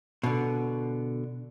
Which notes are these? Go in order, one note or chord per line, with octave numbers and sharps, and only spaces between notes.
B2 D3